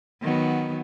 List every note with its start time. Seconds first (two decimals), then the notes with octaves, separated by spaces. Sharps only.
0.22 D#3 F#3 B3